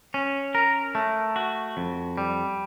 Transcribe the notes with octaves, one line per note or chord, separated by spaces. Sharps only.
C#4
A#4
A3
F#4
F2
G3